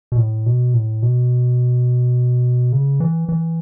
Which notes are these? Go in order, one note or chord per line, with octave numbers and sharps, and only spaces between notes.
B2
A2
B2
A2
B2
C#3
E3
E3